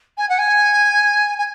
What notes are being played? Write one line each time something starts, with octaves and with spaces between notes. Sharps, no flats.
G#5
F#5
G#5
G#5